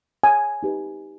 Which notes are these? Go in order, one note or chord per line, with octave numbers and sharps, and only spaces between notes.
G#5
D#4 G4 B4